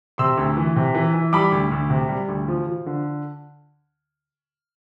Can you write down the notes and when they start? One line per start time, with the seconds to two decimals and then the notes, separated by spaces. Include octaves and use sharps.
0.18 C3 C6 E6
0.37 D2
0.57 E3
0.76 C3
0.94 E3
1.14 E3
1.33 G3 B5 D6
1.52 D2
1.71 D2
1.90 C3
2.09 G3
2.29 D2
2.48 F3
2.67 F3
2.86 D3